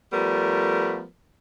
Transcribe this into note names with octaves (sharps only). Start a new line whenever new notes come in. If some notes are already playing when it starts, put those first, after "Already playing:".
F3 G3 A3 B3 A#4